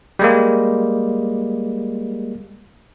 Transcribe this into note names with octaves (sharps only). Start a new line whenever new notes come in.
G3 G#3 A#3